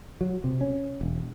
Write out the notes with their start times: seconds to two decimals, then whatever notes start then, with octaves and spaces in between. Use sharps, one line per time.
0.21 F#3
0.44 C3
0.61 C#4
1.01 E1